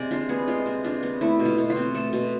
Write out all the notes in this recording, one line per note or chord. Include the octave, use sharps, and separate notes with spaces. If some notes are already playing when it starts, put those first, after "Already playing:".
Already playing: C3 G#3 D5
D4 F4
B3 G#4
G#3 F4
C3
D4 F4
B3
A3 E4
B2
F4
B2
F4
C4
A3 A4
B2